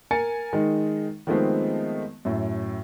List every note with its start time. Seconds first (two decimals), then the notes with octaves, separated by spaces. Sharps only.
0.11 A#4 G#5 A6 C#7
0.53 D#3 G#3 D#4
1.27 D#3 F3 G#3 A3 B3 C4
2.25 F#2 A2